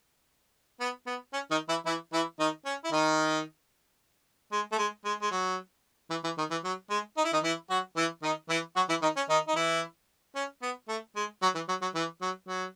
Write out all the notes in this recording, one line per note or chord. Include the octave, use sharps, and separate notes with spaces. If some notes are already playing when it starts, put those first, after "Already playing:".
B3
B3
C#4
D#3 D#4
E3 E4
E3 E4
E3 E4
D#3 D#4
C#4
E4
D#3 D#4
G#3
A3
G#3
G#3
G#3
F#3
E3
E3
D#3
E3
F#3
G#3
D#4
E4
D#3 D#4
E3 E4
F#3 F#4
E3 E4
D#3 D#4
E3 E4
F#3 F#4
E3 E4
D#3 D#4
C#4
D#3 D#4
D#4
E3 E4
C#4
B3
A3
G#3
F#3
E3
F#3
F#3
E3
F#3
F#3